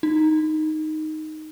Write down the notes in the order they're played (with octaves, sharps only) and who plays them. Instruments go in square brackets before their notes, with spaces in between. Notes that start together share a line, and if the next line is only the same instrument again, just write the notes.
[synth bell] D#4